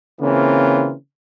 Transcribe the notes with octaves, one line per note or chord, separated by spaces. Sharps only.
C#3 E3 A#3 C4 F4